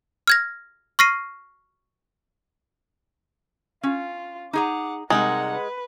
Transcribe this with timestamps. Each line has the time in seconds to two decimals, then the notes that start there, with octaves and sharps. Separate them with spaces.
0.28 F6 G#6 A#6
0.99 C#6 F6 A#6 C7 D#7
3.83 C#4 F4
4.53 D#4 G#4 F#5 A#5 D6
5.10 C3 G3 G#3 D#4 A#4 F#5
5.52 B4